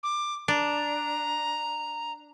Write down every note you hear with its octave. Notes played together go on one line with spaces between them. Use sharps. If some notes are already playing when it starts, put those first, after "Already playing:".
D6
D4 A#5